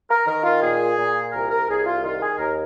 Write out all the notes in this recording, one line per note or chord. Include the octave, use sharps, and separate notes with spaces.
A#4
D#3 A#4
F4
A#2 G#4
A#2
C2 A#4
A#4
C2 G#4
F4
D#3 F4
G#4
D#2 A#4